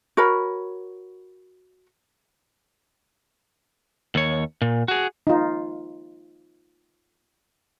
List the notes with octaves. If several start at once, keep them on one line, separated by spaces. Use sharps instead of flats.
F#4 A#4 C#5 B5
D#2 C#5
A#2
F#4 G#4
D#4 F4